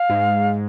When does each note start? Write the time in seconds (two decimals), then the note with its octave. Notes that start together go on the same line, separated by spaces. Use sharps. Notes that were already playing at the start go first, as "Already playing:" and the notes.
Already playing: F5
0.10 G#2